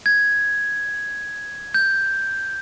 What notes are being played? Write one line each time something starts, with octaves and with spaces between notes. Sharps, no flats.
G#6
G6